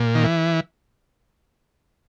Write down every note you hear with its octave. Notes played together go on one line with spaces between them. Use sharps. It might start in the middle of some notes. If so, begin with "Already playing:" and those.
Already playing: A#2
D#3
E3